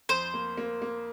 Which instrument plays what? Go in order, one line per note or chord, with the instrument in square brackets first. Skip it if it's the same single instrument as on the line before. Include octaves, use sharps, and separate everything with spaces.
[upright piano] F2 [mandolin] C5
[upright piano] A#3
A#3
A#3